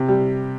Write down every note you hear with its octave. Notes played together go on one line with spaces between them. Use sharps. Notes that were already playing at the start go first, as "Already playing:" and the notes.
Already playing: C3
G3